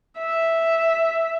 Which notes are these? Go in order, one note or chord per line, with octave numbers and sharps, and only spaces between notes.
E5